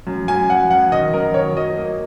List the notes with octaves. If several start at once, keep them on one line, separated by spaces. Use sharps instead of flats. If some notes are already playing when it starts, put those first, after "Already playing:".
F#2
F#2 G#5
F#2 F#5
F#2 F#5
D#3 D#5
F#2 A#4
D#3 C#5
F#3 D#5
A#3